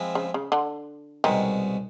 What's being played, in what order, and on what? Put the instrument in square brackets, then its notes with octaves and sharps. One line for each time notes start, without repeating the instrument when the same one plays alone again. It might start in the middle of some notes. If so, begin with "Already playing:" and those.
Already playing: [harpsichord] F3 G#3 C4 E4
[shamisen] C#3
C#3
D3
[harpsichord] C2 B2 G#3 [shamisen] D#3